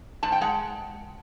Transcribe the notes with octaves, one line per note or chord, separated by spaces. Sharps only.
G#2 A5
G5
G#3 F#5